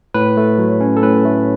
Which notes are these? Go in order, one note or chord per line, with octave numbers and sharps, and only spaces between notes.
A2 B4
A3
F#3
C#4
A4
A2 B4
A3